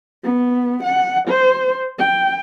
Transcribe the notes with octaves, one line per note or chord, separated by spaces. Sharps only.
B3
F#5
C5
G5